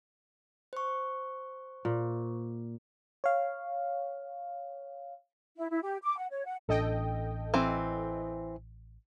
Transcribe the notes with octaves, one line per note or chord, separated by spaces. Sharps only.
C5 C#6
A#2
C#5 F5
E4
E4
G4
D6
F#5
C#5
F#5
A1 D4 A4 D#5 G5
E3 C4